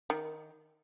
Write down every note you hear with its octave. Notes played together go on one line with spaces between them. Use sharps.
D#3